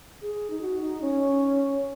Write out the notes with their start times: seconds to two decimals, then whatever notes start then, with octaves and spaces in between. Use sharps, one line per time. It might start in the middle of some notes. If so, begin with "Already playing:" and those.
0.22 G#4
0.50 D#4
0.61 F#4
0.81 D#4
1.02 C#4